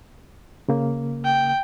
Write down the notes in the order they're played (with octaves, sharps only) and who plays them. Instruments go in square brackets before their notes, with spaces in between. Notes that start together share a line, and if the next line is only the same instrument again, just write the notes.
[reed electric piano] C#3 A#3
[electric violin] G5